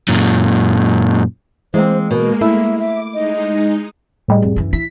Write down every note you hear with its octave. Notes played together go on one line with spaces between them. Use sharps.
F#2 A#2
E3 G#3 A#3 C4 C5
B2 G#3 A#3 A#4
A3 E4 E5
E5 D6
G#3 D#4 D#5
A2 G3 G#3
F2
F#2 E3
E4 B6